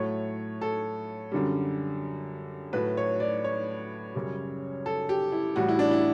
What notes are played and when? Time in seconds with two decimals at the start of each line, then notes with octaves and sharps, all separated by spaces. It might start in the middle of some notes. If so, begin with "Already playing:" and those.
Already playing: A2 F#3 A3 C#5
0.61 A4
1.32 F#2 D3 G3
2.73 A2 F#3 A3 B4
2.97 C#5
3.20 D5
3.44 C#5
4.15 F#2 C#3 G3
4.86 A4
5.09 G4
5.32 E4
5.56 A2 E3 G3 F#4
5.69 E4
5.79 D4
5.91 E4